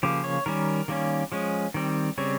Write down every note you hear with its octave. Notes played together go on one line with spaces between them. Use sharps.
C#3 F3 A#3 G4
C#5
D#3 G3 C#4 A#4
D#3 G3 A#3 C#4
F3 G#3 C#4
D#3 G3 C4
C#3 G3 C4 C#5